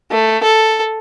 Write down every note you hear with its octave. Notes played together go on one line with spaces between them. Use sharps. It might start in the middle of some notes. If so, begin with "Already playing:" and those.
A3
A4